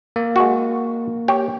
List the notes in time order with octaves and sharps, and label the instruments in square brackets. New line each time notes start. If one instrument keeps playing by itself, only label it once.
[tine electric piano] A#3
[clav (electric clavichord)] G#3 F#4
G4 C#5 G5